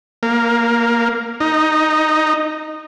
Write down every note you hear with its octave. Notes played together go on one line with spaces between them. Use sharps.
A#3
D#4